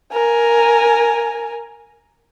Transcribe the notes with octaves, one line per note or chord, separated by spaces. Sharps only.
A#4 G#5